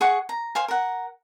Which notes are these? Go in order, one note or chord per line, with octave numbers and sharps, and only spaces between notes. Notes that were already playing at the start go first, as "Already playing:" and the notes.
G#4 F#5 C#6
A#5
C5 F5 G#5
A#4 F#5